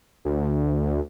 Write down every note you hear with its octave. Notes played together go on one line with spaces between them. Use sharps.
D2